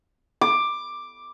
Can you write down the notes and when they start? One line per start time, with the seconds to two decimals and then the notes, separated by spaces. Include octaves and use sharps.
0.41 D6